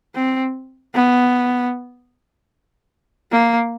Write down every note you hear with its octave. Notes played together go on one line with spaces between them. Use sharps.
C4
B3
A#3